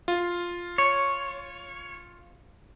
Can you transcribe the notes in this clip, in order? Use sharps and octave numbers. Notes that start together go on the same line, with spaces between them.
F4
C#5